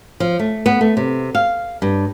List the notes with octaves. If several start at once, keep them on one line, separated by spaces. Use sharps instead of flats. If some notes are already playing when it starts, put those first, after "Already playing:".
F3
A3
B3
A3
C3
F5
G2